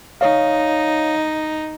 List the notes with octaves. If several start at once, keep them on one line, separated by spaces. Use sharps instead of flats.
D#4 C#5 F5